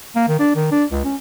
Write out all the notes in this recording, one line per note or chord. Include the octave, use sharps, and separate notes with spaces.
A#3
D#3
D4
D#3
D4
C#2
C#4